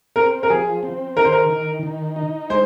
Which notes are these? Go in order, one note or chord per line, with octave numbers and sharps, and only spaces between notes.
C4 A#4
A#4
F3 G#4
C4
D#3 A#4
C5
A#4
D#3
D#3
D#4
G#3 C5